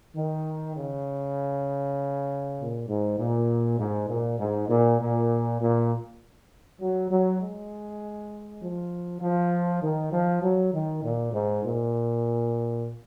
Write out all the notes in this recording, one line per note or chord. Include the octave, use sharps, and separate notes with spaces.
D#3
C#3
A#2
G#2
A#2
G#2
A#2
G#2
A#2
A#2
A#2
F#3
F#3
G#3
F3
F3
D#3
F3
F#3
D#3
A#2
G#2
A#2